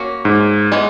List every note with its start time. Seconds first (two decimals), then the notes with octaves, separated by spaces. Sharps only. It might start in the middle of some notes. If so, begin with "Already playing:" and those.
Already playing: A#3 C#4 F#4
0.25 G#2
0.72 E3 G#3 B3